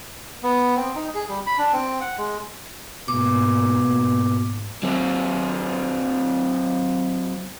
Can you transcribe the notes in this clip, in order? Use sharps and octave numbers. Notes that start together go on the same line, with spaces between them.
B3
C4
D#4
G#4
G3
B5
D4
C4
F#5
G#3
G#2 B2 A#3 D6
F#3 C4